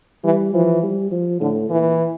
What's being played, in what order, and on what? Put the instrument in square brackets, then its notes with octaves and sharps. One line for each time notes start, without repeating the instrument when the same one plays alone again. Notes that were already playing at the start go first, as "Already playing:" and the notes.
[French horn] E3 [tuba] G3
[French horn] E3 [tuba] F3
[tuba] G3
F3
[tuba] A2 [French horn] D3
[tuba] A#2 [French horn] E3